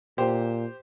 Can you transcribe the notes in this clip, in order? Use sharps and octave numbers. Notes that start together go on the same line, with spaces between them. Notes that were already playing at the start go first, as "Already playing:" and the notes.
A#2 G4 C5